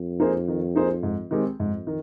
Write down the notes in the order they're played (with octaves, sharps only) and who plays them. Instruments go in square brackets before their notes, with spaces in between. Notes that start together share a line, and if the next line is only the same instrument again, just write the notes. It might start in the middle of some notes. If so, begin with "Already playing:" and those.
Already playing: [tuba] F2
[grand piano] A#3 D#4 G#4 C5
D#3
A#3 D#4 G#4 C5
G#2
D#3 G#3 C4 G4
[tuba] F2 [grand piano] G#2
[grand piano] D#3